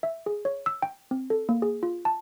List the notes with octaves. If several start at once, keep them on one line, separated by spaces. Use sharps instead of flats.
E5
G#4
C#5
E6
G5
C4
A4
A#3
G#4
F4
A5